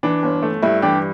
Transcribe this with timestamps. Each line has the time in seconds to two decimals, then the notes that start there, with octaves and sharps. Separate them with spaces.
0.03 E3 D4
0.23 G1
0.43 A3
0.62 G2 E4
0.82 E3 D4 G4